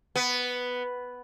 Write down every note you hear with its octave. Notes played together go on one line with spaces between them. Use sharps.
B3